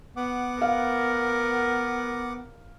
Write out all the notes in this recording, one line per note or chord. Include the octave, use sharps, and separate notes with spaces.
B3 F#5 D6
A#4 F5